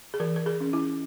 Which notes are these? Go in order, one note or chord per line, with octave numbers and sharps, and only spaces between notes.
G#4
E3 A#4
A#4
G#4
C#4
E4